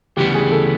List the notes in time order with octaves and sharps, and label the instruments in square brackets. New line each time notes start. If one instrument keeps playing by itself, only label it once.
[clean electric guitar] D2 C#3 E3 G3 B3 [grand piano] G4
[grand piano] G#4
A4